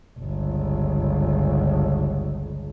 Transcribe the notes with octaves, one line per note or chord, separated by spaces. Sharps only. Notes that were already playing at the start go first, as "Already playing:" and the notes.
G1 C#2